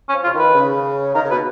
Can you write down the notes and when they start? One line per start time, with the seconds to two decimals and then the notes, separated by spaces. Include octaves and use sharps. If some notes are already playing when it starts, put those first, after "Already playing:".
0.09 C#4
0.13 F3
0.24 C#3 F4
0.34 D#3 B4
0.55 C#3
1.15 D#3 A#4
1.24 C#3
1.31 B2 B4